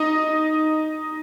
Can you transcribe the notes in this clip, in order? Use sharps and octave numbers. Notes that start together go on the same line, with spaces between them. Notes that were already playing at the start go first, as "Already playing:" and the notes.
Already playing: D#4 D#5